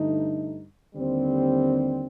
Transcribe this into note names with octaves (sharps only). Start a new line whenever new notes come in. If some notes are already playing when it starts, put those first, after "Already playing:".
Already playing: G2 D3 A3 D#4
D#2 D3 G3 C4